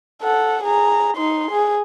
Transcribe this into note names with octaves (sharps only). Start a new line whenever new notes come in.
A4 F#5
G#4 A#5
D#4 C6
G#4